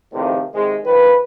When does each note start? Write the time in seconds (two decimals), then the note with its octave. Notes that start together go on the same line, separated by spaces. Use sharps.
0.12 E2 A2 C3 D#3 F3
0.53 C3 D#3 G#3
0.84 D#3 F3 B4